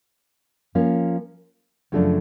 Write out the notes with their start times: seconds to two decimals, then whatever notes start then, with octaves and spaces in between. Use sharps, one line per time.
0.75 F3 A#3 C#4
1.92 F#2 C#3 F3 A3 D4